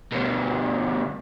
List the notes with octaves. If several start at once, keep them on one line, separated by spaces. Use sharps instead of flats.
D2 B2